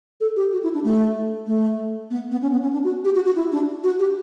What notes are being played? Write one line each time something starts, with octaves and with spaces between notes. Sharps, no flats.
A4
G4
F#4
E4
D4
A3
A3
B3
B3
C#4
B3
C#4
D4
F#4
G4
F#4
F#4
E4
D4
F#4
G4